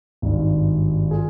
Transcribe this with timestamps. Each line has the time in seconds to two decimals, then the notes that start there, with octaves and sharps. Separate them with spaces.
0.22 G#1 G2 D#3
1.11 F4 G#4